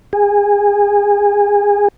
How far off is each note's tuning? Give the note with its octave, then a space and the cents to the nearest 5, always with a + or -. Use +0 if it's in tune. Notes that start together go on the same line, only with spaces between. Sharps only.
G#4 -25